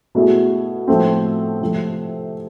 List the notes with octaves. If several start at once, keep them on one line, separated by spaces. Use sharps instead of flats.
B2 A3 E4 G#4
A2 F3 A3 C4
C3 F3 A3